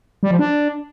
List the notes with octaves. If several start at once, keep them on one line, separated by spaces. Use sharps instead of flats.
G3
F3
D4